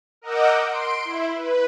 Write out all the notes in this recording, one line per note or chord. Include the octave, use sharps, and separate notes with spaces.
A#4 D#5 F#5 D6 E6 G6
C6 D7
E4
B4